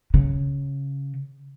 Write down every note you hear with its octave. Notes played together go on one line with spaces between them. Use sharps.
C#3